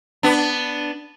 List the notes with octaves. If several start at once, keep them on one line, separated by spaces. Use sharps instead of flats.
B3 D4